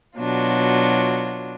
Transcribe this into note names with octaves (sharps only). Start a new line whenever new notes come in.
B2 F#3 D4 F4